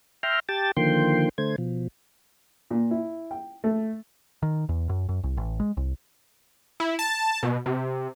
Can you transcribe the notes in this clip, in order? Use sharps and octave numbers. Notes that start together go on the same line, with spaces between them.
E5 G5 A#5 C6 F6
G4 G5 A5 A6
D3 D#3 F3 A#3 G5 C6
D3 A3 C5 G#6
B2 F3
A#2
E4
G5
A3
D#3
E2
F#2
F#2
C2
A1
G#3
C2
E4
A5
B2
C3